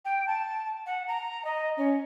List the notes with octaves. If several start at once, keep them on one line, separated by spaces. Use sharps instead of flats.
G5
A5
F#5
A#5
D#5
C#4